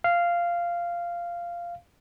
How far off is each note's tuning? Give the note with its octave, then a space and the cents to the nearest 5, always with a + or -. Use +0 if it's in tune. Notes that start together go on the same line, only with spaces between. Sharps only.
F5 -10